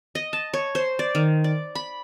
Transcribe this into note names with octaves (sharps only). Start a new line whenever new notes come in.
D#5
A5
C#5
C5
D5
D#3
D5
B5